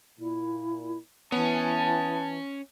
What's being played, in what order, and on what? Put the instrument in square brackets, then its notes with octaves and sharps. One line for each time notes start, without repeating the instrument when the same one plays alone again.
[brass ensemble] A#2 [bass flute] E4
[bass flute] E3 [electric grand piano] B3 [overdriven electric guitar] C#4 [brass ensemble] A5